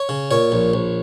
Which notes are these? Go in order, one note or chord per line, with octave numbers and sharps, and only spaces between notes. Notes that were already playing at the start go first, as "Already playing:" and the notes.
Already playing: C#5
C#3
A#2 C#5
A#1
A#1